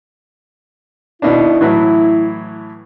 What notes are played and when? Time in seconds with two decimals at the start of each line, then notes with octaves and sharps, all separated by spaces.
1.22 B2 D#3 D4 E4
1.61 A2 E3 F#3